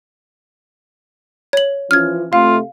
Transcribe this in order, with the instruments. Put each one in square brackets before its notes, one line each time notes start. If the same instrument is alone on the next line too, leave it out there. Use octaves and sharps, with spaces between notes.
[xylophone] C#5 F#7
[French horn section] E3 F3 C#4 [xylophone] F6 G#6
[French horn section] C3 A3 [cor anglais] F4 [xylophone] F5